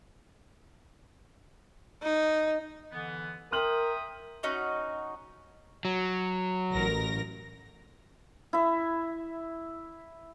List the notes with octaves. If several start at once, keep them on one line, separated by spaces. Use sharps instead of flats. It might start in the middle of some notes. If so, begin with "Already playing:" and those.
D#4
D3 E3 B3
A#4 E5 G5 C6 D#6 F6 F#7
C#4 D#4 F#4 D#5
F#3
A1 A#4 A#6
E4 E5